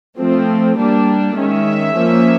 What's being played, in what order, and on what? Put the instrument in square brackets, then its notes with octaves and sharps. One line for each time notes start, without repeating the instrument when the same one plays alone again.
[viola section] F3 A3 C4
G3 A#3 D4
D#3 G#3 C#4 E5
F3 A#3 C#4